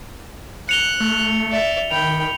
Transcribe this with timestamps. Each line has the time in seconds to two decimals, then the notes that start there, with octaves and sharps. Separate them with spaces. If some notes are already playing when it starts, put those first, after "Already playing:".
0.69 F#6 C#7 F7 G7
1.00 A3
1.51 D5 E5
1.91 D#3 G5 B5 F7